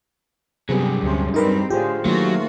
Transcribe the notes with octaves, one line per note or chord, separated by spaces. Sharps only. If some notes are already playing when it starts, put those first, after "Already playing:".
G2 C3 F#3 B3 G4 G#4
D2 C3 C#4
G3 C4 D#4 A#4 B4
A2 D3 F4 G4 G#4 C5
D#3 F#3 A3 A#3 F4 F#4